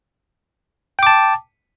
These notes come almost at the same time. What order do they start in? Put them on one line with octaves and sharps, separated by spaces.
G5 D6 A5